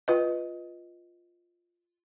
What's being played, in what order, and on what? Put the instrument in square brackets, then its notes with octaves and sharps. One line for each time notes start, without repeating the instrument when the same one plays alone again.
[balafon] F4 B4 D#5